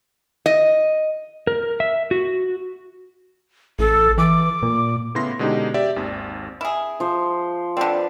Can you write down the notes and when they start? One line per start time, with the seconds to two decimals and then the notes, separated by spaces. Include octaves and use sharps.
0.46 D#5
1.47 A#4
1.80 E5
2.11 F#4
3.79 A1 A4
4.18 E3 D6
4.62 A#2
5.15 A2 C#3 B3 E4 C6 A#6
5.39 B2 D3 G#3 C#4 D#4 G4
5.74 G4 D5 E5
5.96 G#1 D#2 C4
6.61 E4 G#4
7.00 F3 C5
7.77 D3 C4 B4 D5